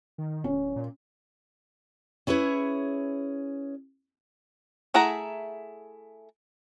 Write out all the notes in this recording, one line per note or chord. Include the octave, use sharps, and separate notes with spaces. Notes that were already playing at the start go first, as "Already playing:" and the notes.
D#3
D1 C#4
A#2
C#4 E4 G#4 B4 C#5
A3 E4 G#4 F#5 A#5